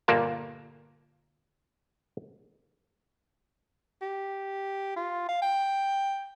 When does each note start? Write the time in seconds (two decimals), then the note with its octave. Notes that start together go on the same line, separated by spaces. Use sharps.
0.08 G1 A#2 A#3 D5 A5
4.02 G4
4.96 F4
5.29 F5
5.42 G5